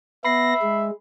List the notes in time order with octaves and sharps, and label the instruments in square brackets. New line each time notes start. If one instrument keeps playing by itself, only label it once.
[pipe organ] B3 A#6 [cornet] E5 [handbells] B5 C7
[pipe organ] G#3